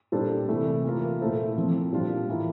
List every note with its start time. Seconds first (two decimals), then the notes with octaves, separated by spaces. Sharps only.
0.12 A#2 G3 D4 A4 C5
0.48 C3 E3 A3
0.85 E3 A#3 F4 A#4
1.21 A#2 A3 E4 A4 C5
1.56 F3 C4 F4
1.92 A#2 G3 D4 F4
2.28 A2 E3 A#3 E4